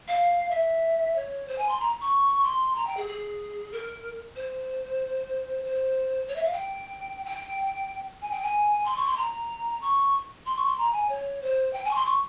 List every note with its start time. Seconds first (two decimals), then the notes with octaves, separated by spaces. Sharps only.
0.08 F5
0.50 E5
1.16 C#5
1.48 C5
1.58 G#5
1.69 C6
1.80 A#5
2.01 C#6
2.43 C6
2.75 A#5
2.87 G5
2.97 G#4
3.08 G#4
3.72 A#4
4.36 C5
5.64 C5
6.28 C#5
6.36 E5
6.45 F5
6.53 G5
7.25 G5
8.22 G#5
8.31 G5
8.43 G#5
8.85 C6
8.96 C#6
9.06 C6
9.17 A#5
9.81 C#6
10.46 C6
10.57 C#6
10.66 C6
10.78 A#5
10.93 G#5
11.09 C#5
11.42 C5
11.73 G5
11.85 G#5
11.91 C#6
11.95 C6
12.06 C#6